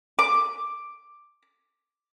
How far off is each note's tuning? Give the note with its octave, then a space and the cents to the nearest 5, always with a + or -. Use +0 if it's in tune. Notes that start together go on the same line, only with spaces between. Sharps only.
D6 +5